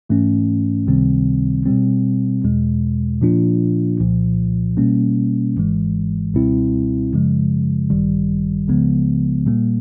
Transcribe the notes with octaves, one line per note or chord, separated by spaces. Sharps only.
G#2 E3 A3 C#4
C#2 C3 D#3 G3 C4
B2 G3 C4
E2 B2 G#3
A#2 F3 A#3 D4 F4
C2 A#2 F3
B2 G3 A#3 C#4
G#1 G#2 E3 G#3
C#2 B2 G3 C4 E4
F#2 C#3 F3 G#3
A1 G2 D#3 G3
C#2 C#3 F3 G#3 B3
A#2 G3 A#3